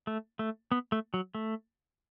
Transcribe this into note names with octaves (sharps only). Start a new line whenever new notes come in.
A3
A3
B3
A3
F#3
A3